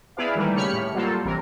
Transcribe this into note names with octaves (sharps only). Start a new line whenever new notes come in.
B3 E4 G#4 B4 D5 F5
D#3 E3 G3 A3 A#3
C#3 G4 C#5 B5 F6 C#7
A2
F#3 G3 A#3 F4 A4 C5
A1 C3 E3 A#4